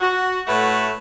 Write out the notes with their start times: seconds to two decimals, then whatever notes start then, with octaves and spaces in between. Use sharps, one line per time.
0.01 F#4
0.47 A2 A3 F#4 B4 E5 F#5